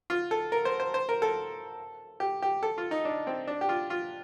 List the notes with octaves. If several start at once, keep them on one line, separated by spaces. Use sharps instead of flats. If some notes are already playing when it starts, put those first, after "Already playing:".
F4
A4
A#4
C5
C5
C5
A#4
A4
G4
G4
A4
F4
D#4
D4
C4
D4
G4
F4
F4